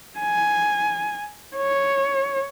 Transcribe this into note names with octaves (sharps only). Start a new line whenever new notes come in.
G#5
C#5